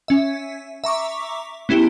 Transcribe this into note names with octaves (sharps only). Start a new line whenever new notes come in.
C#4 E5
E5 A#5 C#6 D6
B3 C#4 E4 G4